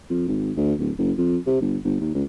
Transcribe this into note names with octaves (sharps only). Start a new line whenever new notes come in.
F2
G#1
D2
D1
F#1
F2
C3
G1
G1
D#2
C#2